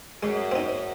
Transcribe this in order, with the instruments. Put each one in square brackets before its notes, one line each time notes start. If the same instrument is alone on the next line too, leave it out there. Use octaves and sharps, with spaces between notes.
[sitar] F#2 [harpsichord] G#3
[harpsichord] C4 D#4